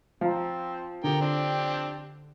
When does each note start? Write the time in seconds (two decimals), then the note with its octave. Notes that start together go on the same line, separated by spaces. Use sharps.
0.21 F3 C4 F5 A#5
1.04 D3 G4 A#4 G5
1.21 C4 D4